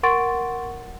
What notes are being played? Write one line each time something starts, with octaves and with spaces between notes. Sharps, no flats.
A#4 F#5 C6 C#6 A6 D7